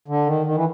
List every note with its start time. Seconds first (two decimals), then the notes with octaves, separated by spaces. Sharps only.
0.08 D3
0.27 D#3
0.46 D#3
0.55 E3